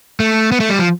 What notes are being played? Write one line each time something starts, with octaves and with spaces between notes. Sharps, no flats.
A3
B3
A3
G3
F3